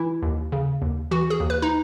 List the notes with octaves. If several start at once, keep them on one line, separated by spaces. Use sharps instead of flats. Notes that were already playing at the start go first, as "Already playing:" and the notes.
Already playing: E3 E4
D#2
C#3
D#2
E3 F#4
G#4
D#2
B4
D#4